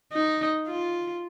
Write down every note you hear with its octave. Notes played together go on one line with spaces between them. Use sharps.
D#4
F4